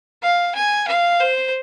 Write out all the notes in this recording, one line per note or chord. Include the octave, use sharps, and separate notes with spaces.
F5
G#5
F5
C5